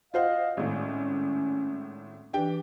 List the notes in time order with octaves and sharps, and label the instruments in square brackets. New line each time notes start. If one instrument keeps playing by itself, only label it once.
[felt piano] F4 C5 F#5 [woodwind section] D#5 F5
[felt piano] G#1 A2 [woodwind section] C#4
[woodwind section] E3 [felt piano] D4 G4 G5